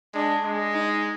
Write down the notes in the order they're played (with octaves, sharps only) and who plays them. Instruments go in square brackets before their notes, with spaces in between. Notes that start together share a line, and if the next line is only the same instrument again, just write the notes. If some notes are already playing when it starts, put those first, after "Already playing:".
[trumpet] G#3 [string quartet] D4
[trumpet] G#3
[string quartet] D#4